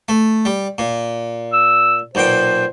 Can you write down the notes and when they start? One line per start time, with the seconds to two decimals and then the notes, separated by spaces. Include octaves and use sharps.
0.08 A3
0.45 G3
0.78 A#2
1.53 E6
2.15 B1 A#2 C5 G5